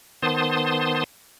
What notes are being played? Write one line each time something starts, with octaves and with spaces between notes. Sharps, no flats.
D#3 B3 C5 A5 C6 D#6